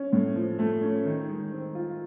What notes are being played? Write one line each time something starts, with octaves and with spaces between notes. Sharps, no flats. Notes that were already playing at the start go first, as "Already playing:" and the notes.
Already playing: C#4
A2
F3
A3
C#4
D#3
G#3
C4
F4